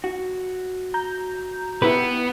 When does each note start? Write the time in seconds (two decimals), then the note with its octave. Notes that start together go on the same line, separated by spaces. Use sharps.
0.04 F#4
0.94 A#5 G6
1.82 B3 E4 G4 B4